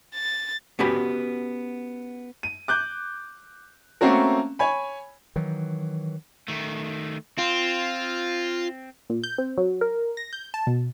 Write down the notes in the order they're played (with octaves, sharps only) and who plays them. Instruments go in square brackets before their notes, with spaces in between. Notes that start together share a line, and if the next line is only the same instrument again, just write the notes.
[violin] A6
[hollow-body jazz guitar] B3 C#4 F#4 G4 B4
[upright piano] D#7
D6 F#6 G6
A3 A#3 C4 C#4 F#4 A#4
C#5 G#5 B5
[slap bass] D#3 E3 F#3
[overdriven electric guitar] D#3 A3
[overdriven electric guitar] C4 [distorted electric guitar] F4
[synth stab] A#2
G6
C4
F#3
A#4
A#6
G6
A5
B2